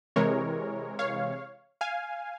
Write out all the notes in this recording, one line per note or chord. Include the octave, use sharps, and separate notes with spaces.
C3 E3 G#3 A#4 C#5
C#5 F5
F5 G#5